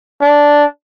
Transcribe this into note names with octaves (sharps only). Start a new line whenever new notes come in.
D4